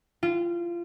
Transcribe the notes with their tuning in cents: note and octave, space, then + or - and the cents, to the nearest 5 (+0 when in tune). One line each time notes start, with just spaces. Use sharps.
F4 -25